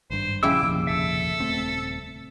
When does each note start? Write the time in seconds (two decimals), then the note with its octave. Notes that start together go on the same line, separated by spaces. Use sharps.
0.10 G#1 G2 C5
0.43 A#1 C#3 E4 G4 D6 E6
0.63 F1 A#1 D#2
0.87 A4 E5
1.40 D#1 A3 C4